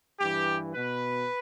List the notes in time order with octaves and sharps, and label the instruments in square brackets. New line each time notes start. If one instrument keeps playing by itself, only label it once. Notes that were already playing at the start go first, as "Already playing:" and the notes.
[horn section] G2 E3 G4
B2 B4